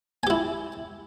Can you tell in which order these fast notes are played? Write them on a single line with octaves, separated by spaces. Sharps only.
G#5 G4 E4